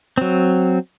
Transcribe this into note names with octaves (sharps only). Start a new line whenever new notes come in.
F#3 C4